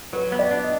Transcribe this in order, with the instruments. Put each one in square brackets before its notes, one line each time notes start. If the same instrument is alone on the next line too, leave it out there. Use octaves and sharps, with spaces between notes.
[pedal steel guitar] F#3 [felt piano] B4
[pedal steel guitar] B3
[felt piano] D5
[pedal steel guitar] D4
[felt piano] D#5